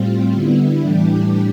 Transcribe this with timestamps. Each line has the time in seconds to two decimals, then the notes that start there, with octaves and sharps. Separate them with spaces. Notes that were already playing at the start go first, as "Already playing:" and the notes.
Already playing: A2 G3 C4 F4
0.32 D3 G3 B3 E4
0.81 A2 E3 G3 D4 G4